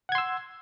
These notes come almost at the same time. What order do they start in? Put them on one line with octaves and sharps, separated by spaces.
F#5 G#6 C6 E6